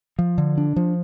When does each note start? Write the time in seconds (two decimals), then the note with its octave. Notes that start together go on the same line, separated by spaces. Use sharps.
0.19 F3
0.38 D3
0.58 D4
0.76 F3